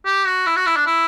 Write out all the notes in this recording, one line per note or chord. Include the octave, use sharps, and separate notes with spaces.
G4
F#4
E4
F#4
E4
D4
E4